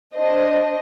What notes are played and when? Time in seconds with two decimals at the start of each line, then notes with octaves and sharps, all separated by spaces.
0.16 D4 C5 D#5